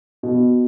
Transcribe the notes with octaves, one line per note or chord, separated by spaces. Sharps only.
B2